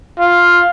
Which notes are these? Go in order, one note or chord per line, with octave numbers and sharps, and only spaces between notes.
F4